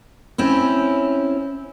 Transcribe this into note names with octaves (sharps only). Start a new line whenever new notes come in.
C4 C#4 E4